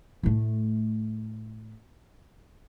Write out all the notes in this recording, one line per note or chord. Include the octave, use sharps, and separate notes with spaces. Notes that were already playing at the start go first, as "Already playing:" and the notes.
A2 A3